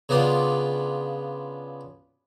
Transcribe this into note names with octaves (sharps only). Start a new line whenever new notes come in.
C#3 B3 D4 F4